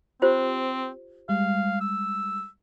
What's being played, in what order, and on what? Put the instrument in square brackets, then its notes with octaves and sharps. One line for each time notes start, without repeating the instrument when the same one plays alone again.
[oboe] C4 [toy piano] F4 G4 C5
[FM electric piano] G3 G#3 [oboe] F5
[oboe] E6